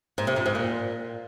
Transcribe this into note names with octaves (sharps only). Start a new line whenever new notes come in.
G#2
C3
F2
G#2
A#2